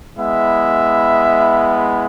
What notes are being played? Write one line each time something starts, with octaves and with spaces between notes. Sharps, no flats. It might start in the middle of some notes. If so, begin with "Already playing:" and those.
G#3 B3 E4 E5